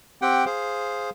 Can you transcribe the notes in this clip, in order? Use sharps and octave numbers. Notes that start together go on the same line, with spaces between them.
C4 G4 F#5 G5
G#4 C5 F5